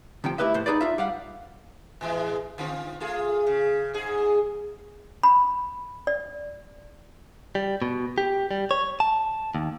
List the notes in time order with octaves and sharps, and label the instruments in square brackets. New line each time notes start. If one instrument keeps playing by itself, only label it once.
[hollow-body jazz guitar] D2 C3 F3 G5
A3 E4 G4 B4 D#5 E5
A2 C5
D#4 F4 G#4 B4 C5 D5
D4 F4 E5
G3 F5 F#5
[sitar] A2 E3 G#3
D3 C4 F4
A3 F4 G#4
C#3
G#2 G#4
[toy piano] B5
D5
[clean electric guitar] G3
B2
G4
G3
C#5
A5
D#2